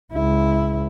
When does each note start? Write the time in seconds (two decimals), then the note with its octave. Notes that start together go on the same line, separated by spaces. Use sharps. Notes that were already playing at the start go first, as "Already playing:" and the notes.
0.14 C#2 E4